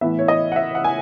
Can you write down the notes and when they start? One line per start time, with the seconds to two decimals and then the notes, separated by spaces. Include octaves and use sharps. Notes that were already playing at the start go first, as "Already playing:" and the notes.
0.01 A2 E3 B3 E5
0.19 C#5
0.28 D#5
0.52 F#5
0.56 E5
0.75 F#5
0.84 G#5